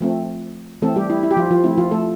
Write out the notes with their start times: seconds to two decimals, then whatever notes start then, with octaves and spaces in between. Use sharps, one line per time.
0.01 F3 A3 C4
0.82 E3 A3 C4 A4
0.96 G3 G4
1.10 E4
1.23 E4
1.31 G4
1.37 F3 F4
1.51 F3 F4
1.64 F3 A3 C4 E4
1.78 F3 F4
1.91 A3 A4